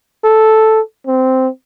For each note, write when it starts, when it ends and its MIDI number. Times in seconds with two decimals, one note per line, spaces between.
0.24 0.81 69
1.07 1.48 60